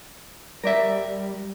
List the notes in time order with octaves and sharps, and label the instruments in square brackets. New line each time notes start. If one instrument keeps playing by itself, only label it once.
[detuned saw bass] G3 [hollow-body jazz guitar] A#4 D5 E5